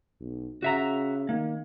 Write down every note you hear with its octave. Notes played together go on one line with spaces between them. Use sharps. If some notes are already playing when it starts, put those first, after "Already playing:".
B1
C#3 F#4 E5 A#5
D#3 A#3